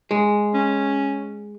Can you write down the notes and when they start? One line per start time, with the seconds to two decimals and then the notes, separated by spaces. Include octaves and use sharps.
0.11 G#3
0.54 C#4